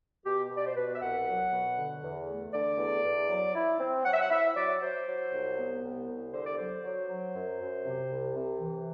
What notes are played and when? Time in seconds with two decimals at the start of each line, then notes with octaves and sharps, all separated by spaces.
0.24 B2 G4
0.50 B2
0.56 D5
0.66 C5
0.75 B2 B4
0.95 E5
1.01 C2 F#5
1.26 F#3
1.52 B2
1.77 D3
2.02 E2
2.28 A3
2.53 D3 D5
2.78 E2
3.03 E2
3.29 F#3
3.55 E4
3.79 C4
4.05 F#3 F#5
4.13 E5
4.21 F#5
4.30 E4 E5
4.56 F#3 D5
4.81 F#3 C5
5.07 F#3
5.31 C2
5.57 B3
5.83 C2
6.07 C2
6.32 D3 C5
6.45 D5
6.57 F#3 C5
6.84 F#3
7.09 F#3
7.34 F#2
7.60 F#2
7.85 C3
8.11 C2
8.36 C3
8.60 E3